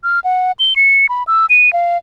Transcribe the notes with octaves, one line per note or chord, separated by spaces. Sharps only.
F6
F#5
G7
C#7
B5
E6
D#7
F5